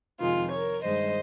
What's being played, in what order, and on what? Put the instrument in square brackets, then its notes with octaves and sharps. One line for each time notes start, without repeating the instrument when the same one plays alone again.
[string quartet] F2 C3 D#3 G#3 F4
A#4 C#5
G2 D#3 G#3 C5 D#5